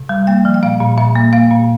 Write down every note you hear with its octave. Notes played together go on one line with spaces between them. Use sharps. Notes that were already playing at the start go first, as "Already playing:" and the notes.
Already playing: C3
G3
A#3 G5
F3
G5
A#2 F5
A#2
A#2 E5
A#3
A#3 F5
A#2